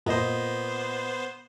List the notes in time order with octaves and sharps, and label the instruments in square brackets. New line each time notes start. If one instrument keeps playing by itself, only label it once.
[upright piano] A#2 D#5 [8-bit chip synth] B3 C5